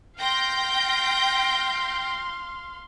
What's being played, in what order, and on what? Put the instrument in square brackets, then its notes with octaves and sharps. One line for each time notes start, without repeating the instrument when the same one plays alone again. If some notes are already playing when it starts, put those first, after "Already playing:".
[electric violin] F5 C6 [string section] G5 G6 A#6